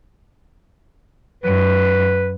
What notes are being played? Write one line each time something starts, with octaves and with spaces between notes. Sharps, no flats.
F#2 B4